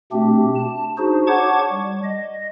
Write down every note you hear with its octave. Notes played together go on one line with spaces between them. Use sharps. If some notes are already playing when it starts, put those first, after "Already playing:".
B2 A3 C4 D4 G4
A5
D4 D#4 F#4 G#4 C5
C#5 F#5 A5 C#6 D6 G#6
G3
D#5